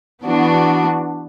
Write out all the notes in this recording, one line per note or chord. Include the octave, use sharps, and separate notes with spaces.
E3 B3 D4 F#4